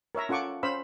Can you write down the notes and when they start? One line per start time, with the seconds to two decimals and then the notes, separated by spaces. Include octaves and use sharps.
0.15 A#4 C#5 E5 A#5
0.29 C#4 F4 A4 F#5 C#6 D6
0.63 C#4 C5 F5 B5 E6